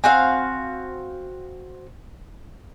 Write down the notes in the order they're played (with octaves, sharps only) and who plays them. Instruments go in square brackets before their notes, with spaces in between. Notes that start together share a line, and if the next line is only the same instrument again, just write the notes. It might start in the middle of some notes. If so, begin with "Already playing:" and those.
[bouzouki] C4 F#4 F5 [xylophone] G#5